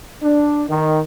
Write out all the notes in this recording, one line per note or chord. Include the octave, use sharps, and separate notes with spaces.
D4
D#3